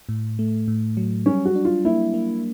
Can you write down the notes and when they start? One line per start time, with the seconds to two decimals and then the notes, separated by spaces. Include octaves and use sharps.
0.09 A2
0.39 A3
0.68 A2
0.97 F#3
1.26 G3 C#4
1.45 F#4
1.55 D4
1.65 F4
1.85 A#3 E4
2.14 A#3